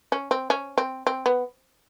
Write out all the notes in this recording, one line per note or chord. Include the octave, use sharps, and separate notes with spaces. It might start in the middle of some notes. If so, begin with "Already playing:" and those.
C#4
C4
C#4
C4
C4
B3